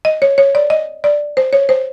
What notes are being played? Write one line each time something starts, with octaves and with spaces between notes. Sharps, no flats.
D#5
C#5
C#5
D5
D#5
D5
C5
C#5
C5